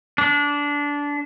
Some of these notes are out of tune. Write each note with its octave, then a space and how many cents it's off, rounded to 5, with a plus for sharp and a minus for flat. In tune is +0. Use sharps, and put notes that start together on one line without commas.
D4 -20